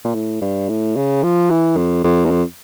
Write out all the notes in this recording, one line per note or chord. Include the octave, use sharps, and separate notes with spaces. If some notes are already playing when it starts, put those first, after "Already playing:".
A#2
A2
G2
A2
C#3
F3
E3
F2
F2
E2
F2